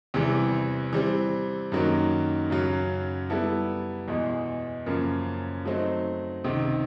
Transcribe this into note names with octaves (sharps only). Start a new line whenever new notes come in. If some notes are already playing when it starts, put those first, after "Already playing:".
E2 C3 E3 G3
E3 G3 C4
F#2 D#3 F#3 A#3
F#2 C#3 F#3
G3 B3 E4 A4
E2 B2 G#3
F#2 C#3 F3 A#3
F#3 A3 C4 D#4
C#2 C3 D#3